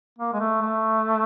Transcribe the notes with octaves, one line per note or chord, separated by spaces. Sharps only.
A#3
G#3
A3
A3